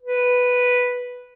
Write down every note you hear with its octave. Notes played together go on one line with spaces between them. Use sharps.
B4